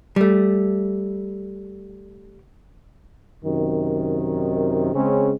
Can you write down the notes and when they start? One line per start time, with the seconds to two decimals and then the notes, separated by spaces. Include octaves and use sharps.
0.16 G3 A3
3.43 F#2 C3 D#3
4.94 C#3 G#3 C4 C#4